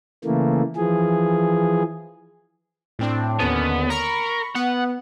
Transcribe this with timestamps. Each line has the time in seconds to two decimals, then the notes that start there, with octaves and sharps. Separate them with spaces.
0.24 C#3 E3 A3 A#3
0.76 E3 F3 G#4
2.99 A2 C4 D4
3.40 D#2 D3 B3 C#4
3.90 A#4 B5 C#6
4.55 B3 F#5